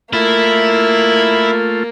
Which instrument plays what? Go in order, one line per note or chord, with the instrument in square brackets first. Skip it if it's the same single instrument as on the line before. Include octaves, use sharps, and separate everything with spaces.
[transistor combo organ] A3 F4 [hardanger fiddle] A#3 [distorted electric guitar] E4